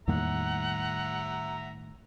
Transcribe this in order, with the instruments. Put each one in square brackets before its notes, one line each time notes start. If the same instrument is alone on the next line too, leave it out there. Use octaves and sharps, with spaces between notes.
[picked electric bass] E2 A#3 [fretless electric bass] A2 D#3 G3 [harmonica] E5 A#5 [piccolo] F#5